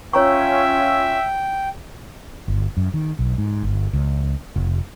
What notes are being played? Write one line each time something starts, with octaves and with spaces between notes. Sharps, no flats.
C#4 F4 C#5 E5 G5 A#5 C#6 E6
G1
F#2
D#3
B1
G#2
G1
C#2
F1